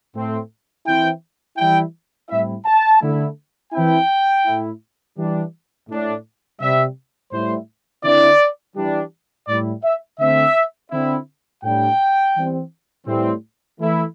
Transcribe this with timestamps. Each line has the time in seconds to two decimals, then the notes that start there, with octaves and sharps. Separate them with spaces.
0.14 A2 A3 C4
0.86 E3 C4 E4 G5
1.57 E3 G3 E4 G5
2.30 A2 G3 C4 E4 E5
2.66 A5
3.01 D3 A3 E4
3.73 E3 C4 E4 G5
4.45 A2 A3 E4
5.17 E3 G3 D4
5.89 A2 A3 D4
6.61 C3 G3 C4 E5
7.32 A2 G3 E4 C5
8.04 D3 C4 E4 D5
8.76 E3 G3 D4
9.47 A2 G3 E4 D5
9.84 E5
10.19 D3 A3 C4 E5
10.91 D3 C4 E4
11.63 A2 G3 D4 G5
12.35 E3 G3 C4
13.07 A2 E3 G3 C4
13.79 E3 A3 E4